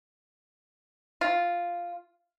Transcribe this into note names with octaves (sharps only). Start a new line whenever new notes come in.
F4